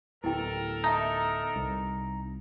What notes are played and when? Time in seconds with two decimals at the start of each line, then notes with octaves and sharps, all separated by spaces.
0.24 D1 B3 E4 G4 A4 A#4 G5
0.84 D#4 E5 A5 A#5
1.56 C2